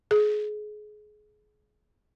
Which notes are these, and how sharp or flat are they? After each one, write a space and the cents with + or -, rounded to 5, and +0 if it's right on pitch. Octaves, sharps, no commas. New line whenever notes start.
G#4 +25